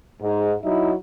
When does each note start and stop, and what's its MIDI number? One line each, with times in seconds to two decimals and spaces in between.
0.21 0.52 44
0.62 0.92 54
0.62 0.92 63
0.62 0.92 64